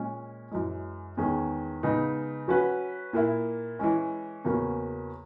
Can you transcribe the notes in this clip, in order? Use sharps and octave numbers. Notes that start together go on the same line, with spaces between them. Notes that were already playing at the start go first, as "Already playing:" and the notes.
Already playing: A#2 G#3 C#4
F#2 E3 G#3
E2 D#3 G#3 C#4 G#4
C#3 G#3 B3 D#4
F#3 C#4 F#4 B4
A#2 A#3 E4 A#4
E3 G#3 C#4
E2 C#3 F#3 A#3 C#4